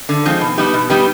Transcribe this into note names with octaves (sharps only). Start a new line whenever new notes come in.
D3
F3 G#3 C4 D#4
B2
G3 B3 D#4 G4
B2
G3 B3 D#4 G4